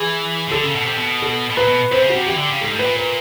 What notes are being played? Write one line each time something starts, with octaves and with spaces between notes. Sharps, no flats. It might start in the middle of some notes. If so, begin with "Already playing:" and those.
Already playing: E3 G#4
C#3
D3 A4
C#3
B2
C3
B2
A4
B2
A#2 B4
B2
C3 C5
C#3
F#4
C3
E3 G4
D3
C#3
G#2 A4
A2
B4
A#2
B4